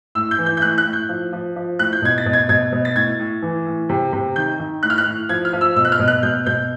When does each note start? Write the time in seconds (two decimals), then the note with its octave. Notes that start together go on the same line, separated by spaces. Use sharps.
0.15 A2 E6
0.31 G6
0.38 E3
0.46 G6
0.57 G6
0.62 A2 F#6
0.78 F#6
0.86 A2
0.93 G6
1.09 F3
1.33 F3
1.56 F3
1.79 A2 F#6
1.93 G6
2.02 B2 G#6
2.18 A6
2.26 B2
2.33 G#6
2.49 B2 G#6
2.72 B2
2.85 A6
2.96 A2 G#6
3.19 A2
3.42 E3
3.66 A2
3.89 C3
4.13 C3
4.36 D#3 G6
4.59 D#3
4.83 A2 F#6
4.90 F6
4.98 F#6
5.06 A2
5.29 F3 G#6
5.45 F6
5.53 F3
5.61 E6
5.76 B2 E6
5.85 F#6
5.92 F6
5.99 B2
6.08 F#6
6.23 B2 G6
6.46 B2 G6